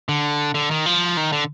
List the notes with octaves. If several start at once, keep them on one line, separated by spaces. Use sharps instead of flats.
D3
D3
D#3
F3
D#3
D3